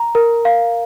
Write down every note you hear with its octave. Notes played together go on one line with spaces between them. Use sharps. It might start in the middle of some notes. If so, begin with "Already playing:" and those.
Already playing: A#5
A#4
F5